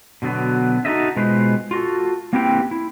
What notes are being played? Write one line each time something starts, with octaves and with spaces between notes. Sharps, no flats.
B2 D3 F#3 B3
D#4 F4 F#4 A4 D#5 E5
B2 G#3 F4 B4 C5
F4 F#4 A4
A#3 C4 E4 G4 B4 G5
E4